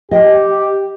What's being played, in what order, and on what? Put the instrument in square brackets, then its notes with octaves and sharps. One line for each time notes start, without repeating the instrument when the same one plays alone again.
[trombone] G4 [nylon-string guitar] D#5 G5